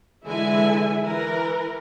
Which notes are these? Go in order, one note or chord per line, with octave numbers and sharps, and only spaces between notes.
D3 E3 G#3 E4 E5 G#5
E3 A#4 B4